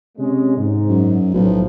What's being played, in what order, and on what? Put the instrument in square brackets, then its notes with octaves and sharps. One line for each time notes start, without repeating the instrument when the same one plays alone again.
[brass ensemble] C3 G#3 C#4
G#2
[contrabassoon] F#2
[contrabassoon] B1 [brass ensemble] A2 F3